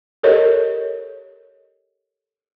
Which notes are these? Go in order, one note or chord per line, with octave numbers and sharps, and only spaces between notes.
G4 A4 A#4 C#5 D#5